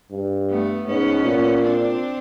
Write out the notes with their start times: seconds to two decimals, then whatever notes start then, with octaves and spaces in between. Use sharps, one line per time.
0.11 G2
0.50 A3 B3
0.87 G#2 B3 C#4
1.25 A#2
1.62 C4 D4